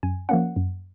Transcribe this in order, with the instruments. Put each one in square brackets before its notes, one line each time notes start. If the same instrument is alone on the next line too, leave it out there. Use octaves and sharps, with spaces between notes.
[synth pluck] F#2 G#5
F3 A#3 C#4 F#5
F#2